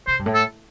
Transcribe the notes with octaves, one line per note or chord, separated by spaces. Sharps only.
C3 C5
G2
A2
A4